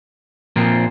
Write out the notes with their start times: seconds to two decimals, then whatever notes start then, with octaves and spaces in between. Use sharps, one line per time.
0.56 A#2 F3 C4